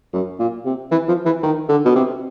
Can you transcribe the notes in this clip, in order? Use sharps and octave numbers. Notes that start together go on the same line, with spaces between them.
F#2
A#2
C3
E3
F3
E3
D#3
D3
B2
C3